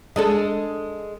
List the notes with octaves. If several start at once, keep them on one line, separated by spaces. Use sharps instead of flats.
G#3 D4 A4